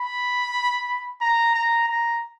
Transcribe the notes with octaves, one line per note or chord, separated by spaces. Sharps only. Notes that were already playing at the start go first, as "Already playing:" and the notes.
Already playing: B5
A#5
A#5
A#5